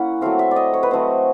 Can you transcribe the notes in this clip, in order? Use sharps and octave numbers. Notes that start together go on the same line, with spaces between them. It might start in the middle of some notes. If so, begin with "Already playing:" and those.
Already playing: A#3 C#4 E4 F#5
F#3 A3 C4 F5
E5
D5
D#5
C#5
B4
F#3 A3 C4 C5